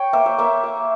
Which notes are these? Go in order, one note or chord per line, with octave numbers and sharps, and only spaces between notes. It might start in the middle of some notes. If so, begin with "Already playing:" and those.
Already playing: C#5 G5
A#3 E5
E5
A#3 E5
A#3